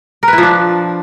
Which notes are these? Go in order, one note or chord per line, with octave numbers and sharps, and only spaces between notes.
A#4
B4
E4
F3
D4